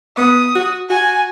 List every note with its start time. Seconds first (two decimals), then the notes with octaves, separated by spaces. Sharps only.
0.18 B3 D#6
0.55 F#4
0.90 F#4 G#5